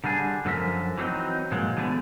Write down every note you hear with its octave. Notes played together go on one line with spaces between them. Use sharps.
D3 G3 D4 G#4
F#2 D3 F3 A4 A#4 E5
E3 F#3 G3 C4 D#4
G2 A#2 F3 F#3 G#3
D3 E3 G#3 A3 B3